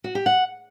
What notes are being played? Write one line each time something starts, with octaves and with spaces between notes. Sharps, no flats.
F#4
G4
F#5